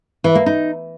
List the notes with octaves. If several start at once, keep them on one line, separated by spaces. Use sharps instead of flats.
E3
A#3
D#4